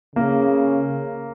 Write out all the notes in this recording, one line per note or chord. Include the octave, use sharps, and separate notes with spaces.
C#3 A#3